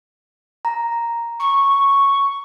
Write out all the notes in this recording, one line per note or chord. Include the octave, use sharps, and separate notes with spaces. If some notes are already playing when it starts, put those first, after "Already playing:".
A#5
C#6